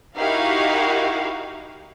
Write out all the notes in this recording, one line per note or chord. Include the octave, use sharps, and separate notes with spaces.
D#4 E4 F#4 G4 A#4 F5